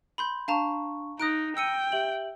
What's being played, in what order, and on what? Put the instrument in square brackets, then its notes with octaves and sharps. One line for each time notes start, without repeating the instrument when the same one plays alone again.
[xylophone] B5 C6 G6
[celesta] D4 C#6 [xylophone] F5 A5 A#5
[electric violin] D#4 [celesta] A#5 A#6 [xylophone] D#6 F#6 D7
[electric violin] G5 [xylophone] E6 C#7 D#7
[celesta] G4 E5 F#7